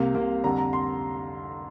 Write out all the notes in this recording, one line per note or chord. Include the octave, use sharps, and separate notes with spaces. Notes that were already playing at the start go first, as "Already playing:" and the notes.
Already playing: C2 C3 A#3 F5
C2 C3 A#3
F2 D3 G3 A#5
A#5
C6